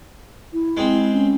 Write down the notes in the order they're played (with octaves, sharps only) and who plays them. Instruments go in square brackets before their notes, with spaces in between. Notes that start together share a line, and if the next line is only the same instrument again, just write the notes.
[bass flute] E4
[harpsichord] G#3 C4
[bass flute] C#4